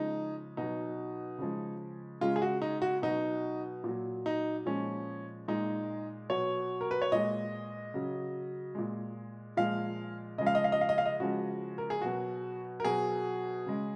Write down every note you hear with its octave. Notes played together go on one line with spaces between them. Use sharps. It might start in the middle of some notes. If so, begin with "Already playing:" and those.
Already playing: C#3 F3 G#3 D#4
B2 F#3 D#4
C#3 F3 G#3
C#3 G#3 F4
G#4
F#4
D#4
F#4
B2 F#3 D#4
A#2 F#3
D#4
A#2 F3 G#3 C#4
A#2 G#3 D#4
B2 F#3 C#5
A#4
B4
C#5
A#2 G#3 D#5
C#3 F#3
A#2 G#3
A#2 F3 G#3 F5
C#3 F3 G#3 D#5
F5
D#5
F5
D#5
F5
D#5
F5
D#5
C#3 F3 G#3 F#4
A#4
G#4
B2 F#3 F#4
A#4
B2 F#3 G#4
C#3 G#3